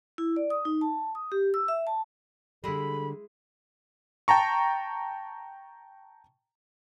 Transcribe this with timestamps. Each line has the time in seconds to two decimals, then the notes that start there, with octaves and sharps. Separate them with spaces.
0.18 E4
0.36 D5
0.50 D#6
0.65 D#4
0.81 A5
1.15 D#6
1.32 G4
1.54 E6
1.68 E5
1.87 A5
2.64 D3 G3 G#3 E4 A4 B5
4.28 G5 A5 A#5 C#6